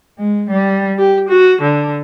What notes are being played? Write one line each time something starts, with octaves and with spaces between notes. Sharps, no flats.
G#3
G3
G4
F#4
D3